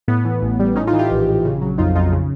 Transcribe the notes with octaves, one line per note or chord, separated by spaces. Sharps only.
A2 B3
E3
A1
G3
A2 C#4 D#4
D#4 F4
E3
F4 G4
A#1
A#1
C#3
F#3
F2 D#4 F4
F2 D#4 F4
C#3